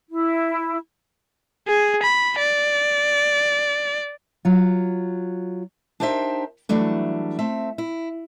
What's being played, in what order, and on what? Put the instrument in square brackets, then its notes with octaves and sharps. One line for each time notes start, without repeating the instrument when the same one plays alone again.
[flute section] E4
[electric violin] G#4
B5
D5
[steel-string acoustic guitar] F#3 F4
D4 D#4 G4 A#4 C5 E5
E3 F#3 G3 A3 D4
A3 C4 E5
E4